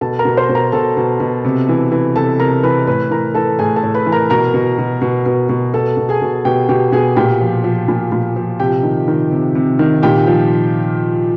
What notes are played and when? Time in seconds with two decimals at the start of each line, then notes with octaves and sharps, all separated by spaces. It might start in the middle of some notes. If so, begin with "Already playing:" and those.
0.01 B2 A4 A5
0.19 A#4 A#5
0.25 B2
0.37 C5 C6
0.49 B2
0.55 A#4 A#5
0.72 B2 A4 A5
0.97 B2
1.20 B2
1.45 C3
1.69 E3
1.92 E3
2.16 C3 A4 A5
2.40 C3 A#4 A#5
2.63 E3 B4 B5
2.87 A2 B4 B5
3.11 E3 A#4 A#5
3.35 E3 A4 A5
3.59 A2 G#4 G#5
3.76 A4 A5
3.83 A2
3.95 B4 B5
4.06 E3
4.12 A#4 A#5
4.30 B2 A#4 A#5
4.54 B2
4.78 B2
5.02 B2
5.26 B2
5.49 B2
5.74 B2 A4 A5
5.97 B2
6.09 G#4 G#5
6.22 B2
6.45 B2 G4 G5
6.69 B2 G4 G5
6.92 B2 G#4 G#5
7.16 A#2 G4 G5
7.41 F3
7.64 F3
7.88 A#2
8.12 A#2
8.36 F3
8.60 C3 G4 G5
8.83 D#3
9.08 D#3
9.31 C3
9.55 C3
9.79 D#3
10.03 A#2 G4 G5
10.27 F3